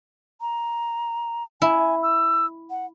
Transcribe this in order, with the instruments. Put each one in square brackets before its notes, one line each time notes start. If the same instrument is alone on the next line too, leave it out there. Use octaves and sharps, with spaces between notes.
[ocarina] A#5
[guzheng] E4 [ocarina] G#5
[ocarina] E6
F#5